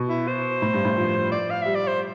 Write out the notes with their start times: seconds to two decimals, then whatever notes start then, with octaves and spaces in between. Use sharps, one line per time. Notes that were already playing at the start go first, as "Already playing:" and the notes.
Already playing: B2
0.09 E4
0.28 C5
0.62 A2
0.73 G2
0.85 A2
0.97 F3
1.31 D5
1.50 F5
1.62 G3 E5
1.75 D5
1.87 C5